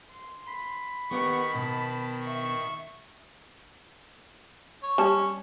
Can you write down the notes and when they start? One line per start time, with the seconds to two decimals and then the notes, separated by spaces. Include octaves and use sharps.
0.12 C6
0.48 B5
1.11 D#3 B3 G4 F#5 C#6
1.54 B2 A5
2.23 E5 C#6
4.82 C#5
4.98 G3 C#4 A5